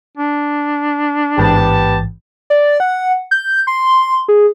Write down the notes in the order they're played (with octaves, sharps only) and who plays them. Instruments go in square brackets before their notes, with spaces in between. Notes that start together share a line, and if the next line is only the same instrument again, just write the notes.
[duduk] D4
[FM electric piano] A1 G#2 E3 [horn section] B3 G4 A5
[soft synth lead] D5
F#5
G6
C6
G#4